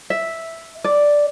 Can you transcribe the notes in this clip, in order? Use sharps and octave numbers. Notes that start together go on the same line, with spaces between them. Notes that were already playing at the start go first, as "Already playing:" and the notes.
E5
D5